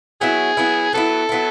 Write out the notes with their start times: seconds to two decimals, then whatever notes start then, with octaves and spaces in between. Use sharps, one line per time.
0.21 F#3 B3 E4 G#4
0.57 F#3 B3 E4
0.93 F#3 B3 E4 A4
1.29 F#3 B3 E4